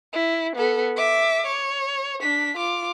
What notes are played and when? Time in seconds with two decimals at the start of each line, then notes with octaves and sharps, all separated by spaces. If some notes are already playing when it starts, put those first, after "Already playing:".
0.13 E4
0.56 B3 A4
0.97 E5 D6
1.46 C#5
2.21 D4 B6
2.57 F4 D6